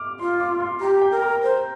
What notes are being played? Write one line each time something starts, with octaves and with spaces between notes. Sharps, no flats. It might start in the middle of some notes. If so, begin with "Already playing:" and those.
Already playing: D6 F6
F4 C6
D6
C6
G4 A#5
G5
A#4
A#5
C5